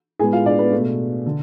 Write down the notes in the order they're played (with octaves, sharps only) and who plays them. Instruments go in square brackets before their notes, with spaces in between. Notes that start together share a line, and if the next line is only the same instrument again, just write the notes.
[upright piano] A2 G#3 B3 G#4 G#5
F4 F5
D4 D5
B3 B4
B2 A3
D3